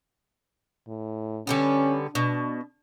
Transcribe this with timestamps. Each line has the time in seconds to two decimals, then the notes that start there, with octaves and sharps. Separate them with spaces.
0.88 A2
1.47 D3 G3 B3 C#4
2.15 B2 D4